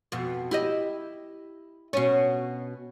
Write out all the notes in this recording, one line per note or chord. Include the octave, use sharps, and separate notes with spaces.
F2 B2
E4 G4 D#5
B2 C#4